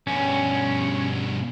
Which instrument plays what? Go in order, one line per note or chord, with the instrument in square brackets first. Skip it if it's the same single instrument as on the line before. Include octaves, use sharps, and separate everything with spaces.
[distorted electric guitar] G2 B2 [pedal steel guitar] C#4